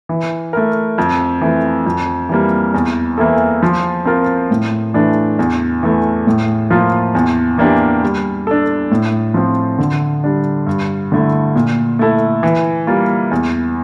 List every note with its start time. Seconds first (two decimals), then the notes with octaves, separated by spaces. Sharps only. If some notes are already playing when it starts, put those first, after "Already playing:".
0.09 E3
0.53 A3 E4 A#4
0.98 F2
1.41 E3 A3
1.86 F2
2.29 E3 G3 A#3
2.74 E2
3.18 E3 A#3 E4 A4
3.63 F3
4.05 C4 F4 A#4
4.51 A2
4.94 E3 A3 D4
5.39 E2
5.83 E3 A3
6.27 A2
6.70 F3 A#3 F4
7.15 E2
7.58 E3 A#3 D4 G4
8.02 G3
8.47 D4 A4
8.91 A2
9.34 F3 C4
9.79 D3
10.24 G3 D4
10.67 G2
11.12 D3 A3 E4
11.55 A#2
11.99 A3 E4 A4
12.43 E3
12.87 G3 A#3 F4
13.31 E2